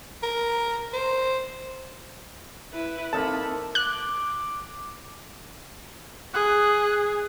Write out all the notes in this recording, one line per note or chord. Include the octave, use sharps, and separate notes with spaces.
A#4
C5
E4 B4
A#3 C4 D#4 A4 A5 B5
D6 F#6
G#4 F#6